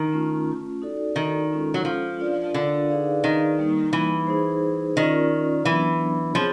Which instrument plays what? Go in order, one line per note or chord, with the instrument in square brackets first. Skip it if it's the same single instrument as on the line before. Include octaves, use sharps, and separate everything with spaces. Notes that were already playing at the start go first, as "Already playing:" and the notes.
Already playing: [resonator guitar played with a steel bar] D#3
[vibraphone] A3 C#4 F4
D#4 F#4 A4 D5
[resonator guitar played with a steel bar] D#3
[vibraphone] G#3 C#4 F4 A4
[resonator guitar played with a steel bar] F#3
F3
[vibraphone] D4 F4 A#4 D5 F5
[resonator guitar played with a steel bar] D3
[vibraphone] D#4 G#4 B4 D5 F5
[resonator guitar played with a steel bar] D#3
[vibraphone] G3 A#3 D#4
[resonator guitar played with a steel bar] E3
[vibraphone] D#4 G#4 C5
[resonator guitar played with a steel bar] D#3 [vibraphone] C#4 F4 A#4 D5
[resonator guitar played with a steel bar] E3 [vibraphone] F#3 B3 D4
[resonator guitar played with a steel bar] F3 [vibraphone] C4 F4 G#4 C#5